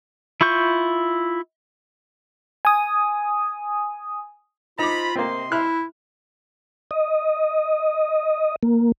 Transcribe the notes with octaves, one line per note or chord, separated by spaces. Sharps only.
E4 F4 C#6 G6
G#5 D#6
D#4 F4 C5 A#5 B5 D6
C3 A#3 C4 D#5 C6
E4 E5 F6 F#6
D#5
A#3